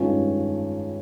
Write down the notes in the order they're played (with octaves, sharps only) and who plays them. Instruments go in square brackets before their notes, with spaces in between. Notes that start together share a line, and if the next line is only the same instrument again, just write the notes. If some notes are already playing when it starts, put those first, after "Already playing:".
Already playing: [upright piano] G2 D#3 G#3 C#4 [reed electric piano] F4